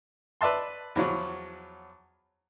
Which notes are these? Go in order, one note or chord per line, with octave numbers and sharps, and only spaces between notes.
B4 D5 E5 A5 C6
E2 F3 F#3